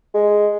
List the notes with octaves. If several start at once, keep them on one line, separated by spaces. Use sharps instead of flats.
G#3